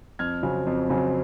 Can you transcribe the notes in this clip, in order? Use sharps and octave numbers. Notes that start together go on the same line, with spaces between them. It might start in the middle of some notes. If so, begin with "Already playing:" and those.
F2 F6 G#6
C#3 F#3 C4
F2
C#3 F#3 C4